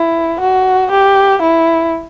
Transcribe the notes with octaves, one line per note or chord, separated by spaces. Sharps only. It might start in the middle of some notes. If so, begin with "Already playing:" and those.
Already playing: E4
F#4
G4
E4